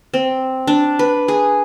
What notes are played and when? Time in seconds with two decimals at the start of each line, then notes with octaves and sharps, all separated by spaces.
0.14 C4
0.67 D4
0.99 B4
1.28 G#4